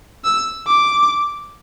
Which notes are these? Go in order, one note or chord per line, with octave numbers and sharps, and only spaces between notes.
E6
D6